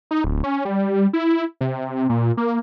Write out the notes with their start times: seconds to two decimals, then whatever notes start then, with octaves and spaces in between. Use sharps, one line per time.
0.11 D#4
0.24 D1
0.44 C#4
0.65 G3
1.13 E4
1.61 C3
2.09 A#2
2.37 A#3